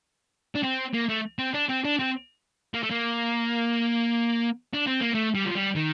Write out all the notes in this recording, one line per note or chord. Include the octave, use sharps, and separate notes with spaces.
D4
C4
A#3
A3
C4
D4
C4
D4
C4
A#3
A3
A#3
D4
C4
A#3
A3
G3
F3
G3
D#3